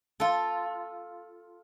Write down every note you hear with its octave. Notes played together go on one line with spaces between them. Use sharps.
F4 A4